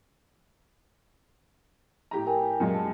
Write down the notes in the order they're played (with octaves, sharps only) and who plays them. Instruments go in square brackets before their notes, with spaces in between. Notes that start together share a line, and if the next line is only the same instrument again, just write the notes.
[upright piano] A2 G4 A#5
[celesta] A#4 G5 G#5
[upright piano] F#2 A#2 G#3
[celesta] A5